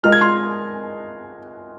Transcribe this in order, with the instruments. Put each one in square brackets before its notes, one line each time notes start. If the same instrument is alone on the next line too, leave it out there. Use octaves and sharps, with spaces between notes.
[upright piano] G#3 F4 A#4 D#5 [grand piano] F6
[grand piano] G#6
C6 F6